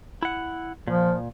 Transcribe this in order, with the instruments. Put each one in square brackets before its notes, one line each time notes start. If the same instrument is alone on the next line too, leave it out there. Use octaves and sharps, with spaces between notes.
[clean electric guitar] E4 F#5
[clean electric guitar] A#2 [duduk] F3